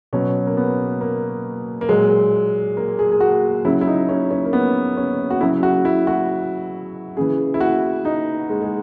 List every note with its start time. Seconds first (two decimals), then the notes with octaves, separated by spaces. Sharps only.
0.13 B2 F#3 C#4
0.47 A#3
0.57 B3
1.01 A#3
1.81 A#3
1.89 A#2 F#3 G#3
2.77 A#3
2.99 G#4
3.12 G#4
3.20 F#4
3.65 C#3 F#3 E4
3.81 E4
3.87 D#4
4.09 C#4
4.31 C#4
4.45 A#3
4.53 B3
4.97 C#4
5.30 F#4
5.41 C#3 F#3 E4
5.63 F#4
5.85 E4
6.07 F#4
7.17 C#3 E3 G#4
7.54 E4
7.60 F#4
8.05 D#4
8.49 G#3
8.62 G#3